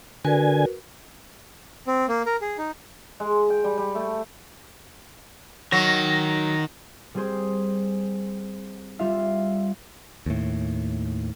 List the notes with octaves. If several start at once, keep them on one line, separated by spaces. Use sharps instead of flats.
D3 F#4 A#4 B4 G#5
C4
A#3
A#4
G#4
D#4
G#3
G5
G3
G3
A3
D#3 F#3 A#6
G3 C4 G4 G#4 C5
G3 F4 E5 F5 E6
D#2 A2